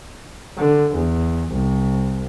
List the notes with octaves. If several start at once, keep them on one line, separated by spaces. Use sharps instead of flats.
D3
E2
C2